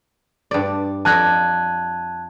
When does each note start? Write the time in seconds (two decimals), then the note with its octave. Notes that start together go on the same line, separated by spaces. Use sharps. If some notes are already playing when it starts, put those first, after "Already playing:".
0.51 G2 D5
1.05 F2 D5 A5 A#5 F#6 G#6